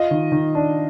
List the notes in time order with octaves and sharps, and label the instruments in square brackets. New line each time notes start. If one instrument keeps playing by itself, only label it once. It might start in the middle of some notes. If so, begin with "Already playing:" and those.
Already playing: [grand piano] F4 D#5
D#3
D#3
D4